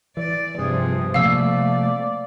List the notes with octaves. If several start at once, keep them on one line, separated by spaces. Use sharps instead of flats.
E3 D5
G2 C3 F3 G#4
C3 F3 A3 A#3 D5 F5 E6